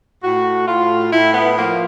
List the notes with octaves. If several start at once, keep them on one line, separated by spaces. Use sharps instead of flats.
A2 F#4
A2 F4
A2 E4
B3
F3 A#3